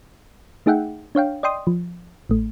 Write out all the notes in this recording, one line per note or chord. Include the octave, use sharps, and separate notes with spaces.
A3 D#4 G#4 E5 F#5 G5
D4 C#5 F5 G5
D5 D#5 G5 C6 D#6
F3
A1 A3